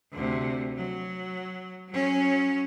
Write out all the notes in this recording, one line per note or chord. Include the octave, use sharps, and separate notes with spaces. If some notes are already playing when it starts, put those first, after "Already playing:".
D2 C3
F#3
F#3 C#4